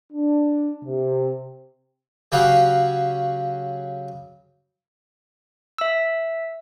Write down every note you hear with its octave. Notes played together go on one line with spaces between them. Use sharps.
D4
C3
C#3 F#3 C#4 G4 F5 F#5
E5 E6